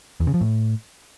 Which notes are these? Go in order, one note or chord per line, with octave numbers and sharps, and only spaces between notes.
E2
C#3
F3
A2